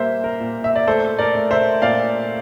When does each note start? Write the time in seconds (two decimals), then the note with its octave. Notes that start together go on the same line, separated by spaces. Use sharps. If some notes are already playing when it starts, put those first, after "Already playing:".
Already playing: A#2 G3 A#3 C5 E5
0.24 A#4
0.40 A#2
0.64 E5
0.75 D5
0.88 A3 A4 C5
1.19 A#4 D5
1.35 A3
1.51 C5 E5
1.82 A#2 D5 F5